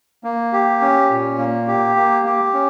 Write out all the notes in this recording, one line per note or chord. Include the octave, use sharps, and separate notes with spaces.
A#3
G4
C#4
A#2
A#3
G4
A#3
G4
C#4